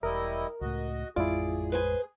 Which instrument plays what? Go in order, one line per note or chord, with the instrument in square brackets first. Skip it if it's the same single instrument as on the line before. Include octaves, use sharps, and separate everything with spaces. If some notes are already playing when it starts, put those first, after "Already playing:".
[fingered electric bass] E1 [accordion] G3 E4 D#5 [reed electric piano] A#4
[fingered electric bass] C#2 A2 [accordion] F#4 D#5
[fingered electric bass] A1 F2 G#3 [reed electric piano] E4 F4 [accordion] G#4 [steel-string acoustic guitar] D5
[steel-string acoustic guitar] B4 C5 G#5